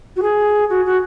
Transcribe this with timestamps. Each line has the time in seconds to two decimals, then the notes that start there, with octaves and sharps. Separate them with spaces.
0.16 F#4
0.22 G#4
0.69 F#4
0.85 F#4